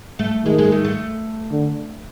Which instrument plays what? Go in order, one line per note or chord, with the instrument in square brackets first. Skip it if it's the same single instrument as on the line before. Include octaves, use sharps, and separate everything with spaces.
[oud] A3
[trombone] D#3 [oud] G#3
[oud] G#3
A3
A3
[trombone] D3